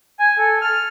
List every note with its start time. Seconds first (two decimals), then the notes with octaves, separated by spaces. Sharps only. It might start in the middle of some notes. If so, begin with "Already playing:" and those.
0.19 G#5
0.38 A4
0.61 F6